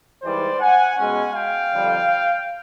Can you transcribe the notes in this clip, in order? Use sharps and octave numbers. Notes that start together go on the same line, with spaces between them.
G#2 E3 G3 C5 D5
F#5 G#5
B2 G#3 C#4 F#5 G#5
F5 G5
F2 D3 G3